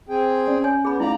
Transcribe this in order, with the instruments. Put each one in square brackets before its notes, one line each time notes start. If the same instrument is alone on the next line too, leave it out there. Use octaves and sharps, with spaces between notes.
[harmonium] C4 G#4 G5
[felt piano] C#4 [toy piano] D5
[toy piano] C#5 G#5
[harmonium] B3 [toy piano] G#4 C#5 B5
[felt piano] A3 D#4 [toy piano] E4 F5 [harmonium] D5 A#5